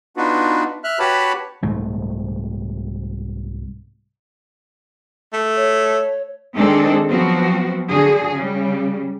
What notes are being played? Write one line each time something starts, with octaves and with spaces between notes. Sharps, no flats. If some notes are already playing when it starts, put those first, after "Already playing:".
B3 D4 D#4 F4 F#4 B4
E5 F6 F#6
F#4 G4 B4 C#5 A5 B5
C2 G#2 A3
A3
C#5
D#3 G#3 C4 D4 G#4 A4
F3 F#3 B3 C4 F#4
D3 F#4 G#4
C#3 G3